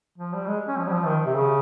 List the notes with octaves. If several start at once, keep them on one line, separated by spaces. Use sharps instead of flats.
F3
G3
G#3
C#4
F3
G3
F3
D#3
C3
C#3